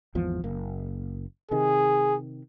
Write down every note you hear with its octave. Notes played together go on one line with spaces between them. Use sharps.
G#1 E2 F3
F#1 A#3
C3 D#3 G#4